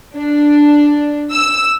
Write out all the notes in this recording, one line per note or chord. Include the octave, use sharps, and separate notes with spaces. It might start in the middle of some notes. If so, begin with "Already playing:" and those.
D4
E6